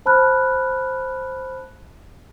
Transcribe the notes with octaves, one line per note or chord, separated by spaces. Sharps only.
C5 A5 B5 F6 F#6